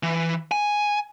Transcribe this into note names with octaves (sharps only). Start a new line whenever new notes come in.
E3
G#5